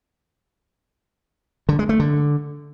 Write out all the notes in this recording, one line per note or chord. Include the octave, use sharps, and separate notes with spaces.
D3
G#3
A3
D3